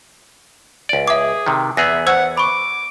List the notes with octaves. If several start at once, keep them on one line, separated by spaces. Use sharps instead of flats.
C#2 D5
G#4 E5 D6
C3 D#3
E2 B3 G#4 E5 A#6
C5 F#5 E6 G#6
B5 C#6 D6